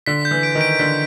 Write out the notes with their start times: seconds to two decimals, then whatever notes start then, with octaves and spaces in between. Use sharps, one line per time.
0.06 D3 B6
0.25 G6
0.31 E3
0.43 D7
0.55 D#3
0.61 D7
0.79 D3 B6